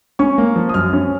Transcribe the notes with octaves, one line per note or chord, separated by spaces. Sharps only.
C#4 C#6
A#3
F3
D#6
F#2 F6
C#4